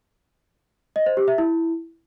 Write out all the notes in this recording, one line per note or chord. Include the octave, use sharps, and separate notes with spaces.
D#5
C5
G4
E5
E4